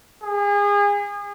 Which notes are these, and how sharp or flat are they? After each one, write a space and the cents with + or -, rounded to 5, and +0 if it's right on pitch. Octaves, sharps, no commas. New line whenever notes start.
G#4 -35